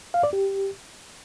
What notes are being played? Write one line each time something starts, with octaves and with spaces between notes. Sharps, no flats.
F5
D5
G4